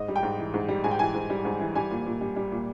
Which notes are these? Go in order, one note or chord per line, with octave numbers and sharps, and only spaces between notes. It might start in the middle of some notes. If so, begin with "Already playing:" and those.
Already playing: G#2 D#5
G3
G5
G#2
E3
G#2
G3
G#2 G#5
G5
E3 G#5
G#2
G3
G#2
E3
G3 G#5
A#2
A#2
G3
G3
A#2